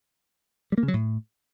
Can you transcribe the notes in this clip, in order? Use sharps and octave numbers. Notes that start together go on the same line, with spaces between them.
G3
A#3
C#3
F#3
A2